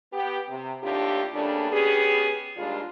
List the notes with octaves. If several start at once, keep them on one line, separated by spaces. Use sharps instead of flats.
B3 G4
C3
D#2 A2 D4 F4 G4
C#3 G3 A3 A#3 D4
B3 C#4 G4 G#4
D#2 A#2 G3 G#3 D4 F4